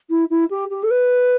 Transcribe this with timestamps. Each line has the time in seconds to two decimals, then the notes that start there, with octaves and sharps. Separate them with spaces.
0.10 E4
0.30 E4
0.50 G4
0.70 G4
0.83 A4
0.90 B4